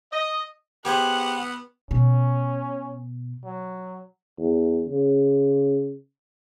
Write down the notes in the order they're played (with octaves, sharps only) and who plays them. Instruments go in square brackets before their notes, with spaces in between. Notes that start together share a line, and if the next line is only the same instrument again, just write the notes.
[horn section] D#5
[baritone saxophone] B3 [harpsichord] G4 G#4 C5 [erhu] F#5
[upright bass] B2 [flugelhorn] C#4
[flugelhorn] F#3
[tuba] E2
C#3